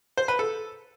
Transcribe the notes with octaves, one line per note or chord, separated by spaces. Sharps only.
C5
B4
A4